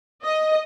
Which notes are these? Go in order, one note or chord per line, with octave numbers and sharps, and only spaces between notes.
D#5